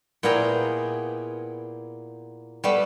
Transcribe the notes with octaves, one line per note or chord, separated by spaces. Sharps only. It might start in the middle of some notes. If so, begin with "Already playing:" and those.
A#2 B3 E4 G#4 G5 A#5
G3 A3 B3